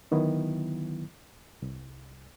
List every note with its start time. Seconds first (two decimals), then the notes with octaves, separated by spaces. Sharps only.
0.11 D3 D#3 F#3 B3 E4
1.62 C2